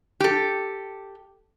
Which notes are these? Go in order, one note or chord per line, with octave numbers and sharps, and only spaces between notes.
G4 A4